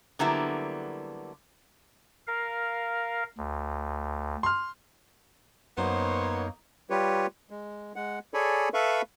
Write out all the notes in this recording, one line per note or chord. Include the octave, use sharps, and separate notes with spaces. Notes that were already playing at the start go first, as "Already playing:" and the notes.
D3 F#3 G3 A#3 B3 E4
A#4 F5
D2
C6 F6
F#2 A#3 B3 D#4 C5 C#5
G3 F4 G4 B4 C#5
G#3
G#3 F#5
G#4 A4 C#5 D5 G#5 B5
A4 B4 E5 F5 B5 C#6